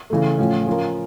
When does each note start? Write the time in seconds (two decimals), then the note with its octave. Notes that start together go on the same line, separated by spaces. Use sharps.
0.10 C#3 E3 A3
0.38 A2 F3 C#4
0.67 F3 C#4 F4 A#4